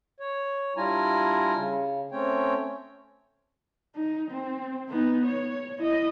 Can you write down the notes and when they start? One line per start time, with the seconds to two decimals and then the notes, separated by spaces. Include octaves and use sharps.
0.20 C#5
0.77 G3 D4 E4 F4 G#5 A#5
1.56 C#3
2.12 A3 C4 C#4 C#5 G5
3.95 D#4
4.31 C4
4.89 B3 D#4
5.26 C#5
5.79 E4 D#5